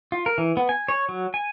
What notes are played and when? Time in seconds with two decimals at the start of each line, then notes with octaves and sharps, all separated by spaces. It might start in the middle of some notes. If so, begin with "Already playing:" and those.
0.12 F4
0.26 A#4
0.38 E3
0.57 B3
0.69 G#5
0.88 C#5
1.09 F#3
1.34 G#5